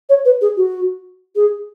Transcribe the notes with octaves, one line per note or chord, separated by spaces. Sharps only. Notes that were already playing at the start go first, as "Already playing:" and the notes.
C#5
B4
G#4
F#4
G#4